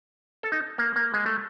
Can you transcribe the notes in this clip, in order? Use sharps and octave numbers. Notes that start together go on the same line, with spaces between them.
A4
D#4
A#3
A#3
G#3
A3